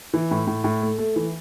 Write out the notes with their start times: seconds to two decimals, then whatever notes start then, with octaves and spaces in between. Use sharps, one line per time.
0.14 E3
0.31 A2
0.47 A2
0.64 A2
0.82 A3
0.98 A3
1.16 E3